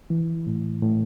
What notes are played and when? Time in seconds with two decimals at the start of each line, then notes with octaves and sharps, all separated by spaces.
0.10 E3
0.47 A2
0.82 A2